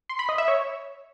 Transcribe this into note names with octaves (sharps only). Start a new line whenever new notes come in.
C6
B5
D#5
E5
C#5